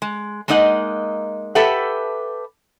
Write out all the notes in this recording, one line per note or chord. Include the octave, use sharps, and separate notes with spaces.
G#3
G#3 A#3 D#4 D#5 F#5
G4 A4 B4 E5 F#5